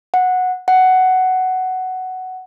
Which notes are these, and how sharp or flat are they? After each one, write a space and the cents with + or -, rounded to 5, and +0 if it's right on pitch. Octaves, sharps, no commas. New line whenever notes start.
F#5 -10
F#5 +10